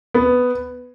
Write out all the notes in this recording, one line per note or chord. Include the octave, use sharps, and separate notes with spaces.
B3